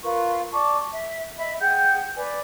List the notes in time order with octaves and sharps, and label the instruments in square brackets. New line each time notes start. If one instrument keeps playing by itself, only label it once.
[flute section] F4 A#4 B4 C#6
D5 A5 C#6 D6
E5
D#5 E5 B5
G#4 F#5 G5 G6
B4 D5 G#5